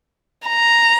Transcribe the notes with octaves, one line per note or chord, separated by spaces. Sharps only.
A#5